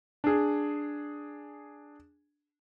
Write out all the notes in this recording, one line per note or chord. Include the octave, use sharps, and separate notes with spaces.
D4 G#4